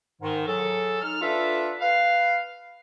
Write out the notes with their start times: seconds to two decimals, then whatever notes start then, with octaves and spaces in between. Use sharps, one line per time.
0.21 G#2 D#3
0.47 F#3 G#4 A4
1.02 D#4 F6
1.21 D4 F4 A4 B4 E5
1.80 B4 F5